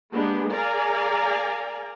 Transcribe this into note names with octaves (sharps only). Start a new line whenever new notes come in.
G#3 A#3 B3 D4 G4 G#4
G#4 A#4 D5 F5 G#5 A#5